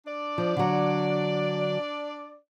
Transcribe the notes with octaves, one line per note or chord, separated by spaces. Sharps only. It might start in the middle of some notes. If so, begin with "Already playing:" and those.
D4 D5
F3
D3 F#3